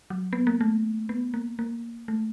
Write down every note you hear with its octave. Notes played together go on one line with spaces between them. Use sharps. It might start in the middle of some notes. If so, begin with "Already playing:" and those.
F#3
B3
A#3
A3
B3
A#3
A#3
A3